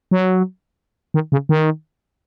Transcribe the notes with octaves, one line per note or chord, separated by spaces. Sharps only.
F#3
D#3
C#3
D#3